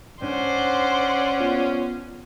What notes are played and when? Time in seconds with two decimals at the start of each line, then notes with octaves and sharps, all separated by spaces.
0.22 G#2 C#4 D4 C5 D5 F#5
1.40 B3 F4